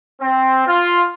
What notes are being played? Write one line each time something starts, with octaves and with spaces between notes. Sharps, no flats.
C4
F4